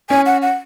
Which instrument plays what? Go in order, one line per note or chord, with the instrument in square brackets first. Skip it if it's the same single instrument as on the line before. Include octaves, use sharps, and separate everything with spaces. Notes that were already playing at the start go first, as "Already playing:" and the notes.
[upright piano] C#4 [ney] G#5
[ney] F#5
F#5